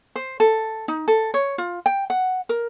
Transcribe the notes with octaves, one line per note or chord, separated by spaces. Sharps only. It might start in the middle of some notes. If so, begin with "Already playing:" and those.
C5
A4
D#4
A4
C#5
F4
G5
F#5
A#4